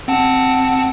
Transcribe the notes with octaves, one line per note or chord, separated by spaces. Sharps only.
C4 F#5 A5